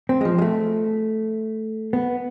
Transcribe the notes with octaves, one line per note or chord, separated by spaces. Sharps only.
C4
G#3
F3
G#3
A3
B3